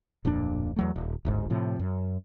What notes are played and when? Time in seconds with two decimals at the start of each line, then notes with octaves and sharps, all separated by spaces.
0.25 D1 F2 A#2 D4
0.76 E2 F#3 A3
0.96 D#1
1.25 D1 G1 G#2
1.50 A2 C3 F3
1.79 F#2